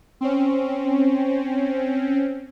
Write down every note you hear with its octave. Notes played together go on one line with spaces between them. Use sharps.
C4 C#4